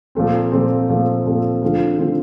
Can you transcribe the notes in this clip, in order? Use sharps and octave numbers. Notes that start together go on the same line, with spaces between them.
A#2 F3 A3 C4
A#2 F3 A3 C4
A#2 F3 A3 C4
A#2 F3 A3 C4
D3 F3 A3 C4 F4
D3 F3 A3 C4 F4